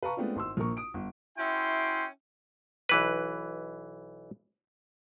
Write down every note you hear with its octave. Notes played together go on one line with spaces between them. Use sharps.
B4 F5 A5 A#5 C#6
G#3 A3 B3 C4 D4 F4
G#1 C6 E6
A#1 A#2 A#4 C#6
D#6 D7
G1
C#4 E4 F#4 E5 G5 C6
B1 E3 B4